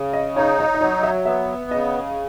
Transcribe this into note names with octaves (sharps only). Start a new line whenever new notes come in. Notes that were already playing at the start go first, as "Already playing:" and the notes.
Already playing: C#3
D#5
D#4 C#5
C#5
D#5
F#3 C#5
E5
B3 E5
C#3 D#5